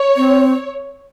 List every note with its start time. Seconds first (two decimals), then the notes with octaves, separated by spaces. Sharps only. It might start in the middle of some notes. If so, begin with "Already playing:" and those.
Already playing: C#5
0.17 C4